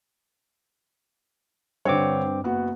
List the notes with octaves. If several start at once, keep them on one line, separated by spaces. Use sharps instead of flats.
G2 D3 C4 C#5 D6
F#1 B3 F#4